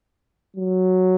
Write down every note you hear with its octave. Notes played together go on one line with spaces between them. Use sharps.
F#3